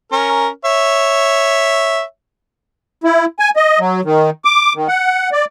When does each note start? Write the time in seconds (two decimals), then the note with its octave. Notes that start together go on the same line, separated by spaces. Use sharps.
0.12 C#4 A#4
0.65 C#5 E5
3.04 E4
3.39 G#5
3.56 D#5
3.79 F#3
4.05 D#3
4.45 D6
4.76 D#3
4.88 F#5
5.32 D5